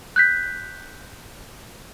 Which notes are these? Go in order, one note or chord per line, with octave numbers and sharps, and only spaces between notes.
F#6 G6 B6